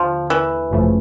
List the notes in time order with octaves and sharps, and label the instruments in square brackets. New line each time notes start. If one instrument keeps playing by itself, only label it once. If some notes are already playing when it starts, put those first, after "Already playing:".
Already playing: [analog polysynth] D#2 D3 [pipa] F3
[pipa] E3
[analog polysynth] G#1 F#2 C#3 F3 A3